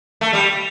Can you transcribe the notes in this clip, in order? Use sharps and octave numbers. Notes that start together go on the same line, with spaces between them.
A3
G3